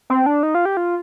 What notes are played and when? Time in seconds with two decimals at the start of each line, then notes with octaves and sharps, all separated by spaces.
0.10 C4
0.26 D4
0.43 D#4
0.55 F4
0.65 G4
0.77 F4